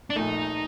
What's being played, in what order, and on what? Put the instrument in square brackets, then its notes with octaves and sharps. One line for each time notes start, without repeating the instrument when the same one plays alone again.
[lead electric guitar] D4
[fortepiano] A#1 A#2 A3 [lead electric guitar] D#4